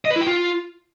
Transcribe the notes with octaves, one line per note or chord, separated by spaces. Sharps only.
D#5
B4
E4
G5
F4